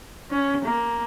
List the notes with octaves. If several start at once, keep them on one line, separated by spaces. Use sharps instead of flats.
C#4
A#3